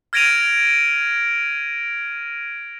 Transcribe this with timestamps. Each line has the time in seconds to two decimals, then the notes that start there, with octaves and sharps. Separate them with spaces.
0.13 F6 G#6 A#6 D7 D#7 F7